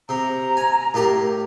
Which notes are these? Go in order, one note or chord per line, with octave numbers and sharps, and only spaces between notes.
C3 A#5
G#5
A2 A#3 G4